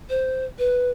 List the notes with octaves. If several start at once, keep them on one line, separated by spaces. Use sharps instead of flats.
C5
B4